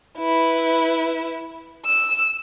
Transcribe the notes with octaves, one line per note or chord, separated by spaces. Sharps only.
E4 B4
E6